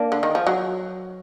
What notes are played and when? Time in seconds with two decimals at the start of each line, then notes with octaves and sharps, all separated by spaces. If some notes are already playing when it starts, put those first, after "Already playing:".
Already playing: A#3 D4
0.12 D3
0.23 D#3
0.35 F3
0.47 F#3